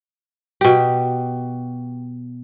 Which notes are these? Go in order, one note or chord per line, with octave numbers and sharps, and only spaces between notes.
B2 G4